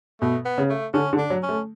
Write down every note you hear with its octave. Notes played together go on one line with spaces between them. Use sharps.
B2 A3
B3
C#3
A3
D3 C#4
D3
D4
F#3
C#4
A3